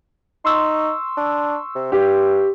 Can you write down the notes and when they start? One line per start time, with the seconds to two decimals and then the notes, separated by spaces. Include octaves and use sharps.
0.45 D#4 C6 C#6 E6
1.17 D4
1.75 C3
1.92 G2 G4